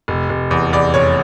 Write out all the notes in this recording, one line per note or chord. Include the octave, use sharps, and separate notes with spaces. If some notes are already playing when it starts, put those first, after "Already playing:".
F1
F1
E2
E2 D5
F1 C#5